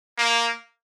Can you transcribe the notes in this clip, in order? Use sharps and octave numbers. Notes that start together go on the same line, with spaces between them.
A#3